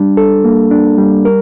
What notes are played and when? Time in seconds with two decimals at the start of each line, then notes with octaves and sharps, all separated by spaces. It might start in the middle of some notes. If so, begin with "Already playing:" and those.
Already playing: G3 D4
0.17 A4
0.45 A#3
0.71 D4
0.98 G3
1.25 A#4